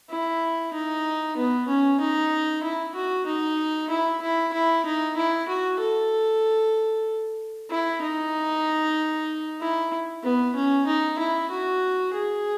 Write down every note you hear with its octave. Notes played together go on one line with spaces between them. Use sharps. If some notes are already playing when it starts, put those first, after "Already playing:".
E4
D#4
B3
C#4
D#4
E4
F#4
D#4
E4
E4
E4
D#4
E4
F#4
A4
E4
D#4
E4
B3
C#4
D#4
E4
F#4
G#4